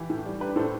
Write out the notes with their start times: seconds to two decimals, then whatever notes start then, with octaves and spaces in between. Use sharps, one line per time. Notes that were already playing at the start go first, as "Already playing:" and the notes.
Already playing: E3 G4
0.10 A2
0.25 G3
0.40 D4 G4 B4
0.56 A2 A4 C5